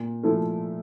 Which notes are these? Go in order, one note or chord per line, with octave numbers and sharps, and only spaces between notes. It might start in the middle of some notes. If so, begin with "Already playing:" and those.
Already playing: A#2
F3 A3 E4